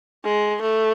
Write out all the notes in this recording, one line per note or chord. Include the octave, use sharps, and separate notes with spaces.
G#3
A3